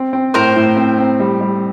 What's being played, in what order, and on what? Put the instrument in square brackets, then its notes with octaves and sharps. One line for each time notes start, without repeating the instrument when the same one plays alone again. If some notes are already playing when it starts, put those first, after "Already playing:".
Already playing: [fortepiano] C4
C4
[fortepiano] A2 [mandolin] A#4 C5
[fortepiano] A2
C4
C4
G3
G3